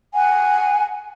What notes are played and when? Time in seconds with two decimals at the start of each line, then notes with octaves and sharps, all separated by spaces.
0.13 F#5 G#5